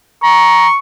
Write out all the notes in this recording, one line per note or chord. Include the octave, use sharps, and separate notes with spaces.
A#5 C#6